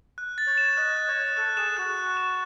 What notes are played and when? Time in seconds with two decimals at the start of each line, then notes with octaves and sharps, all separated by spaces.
0.18 F#6
0.38 A6
0.47 C#5
0.58 E7
0.77 D#5 F#6
0.97 F#6
1.08 C#5
1.18 F#6
1.37 A4 F#6
1.57 G#4 E7
1.77 F#4 F#6
1.97 F#6
2.17 E7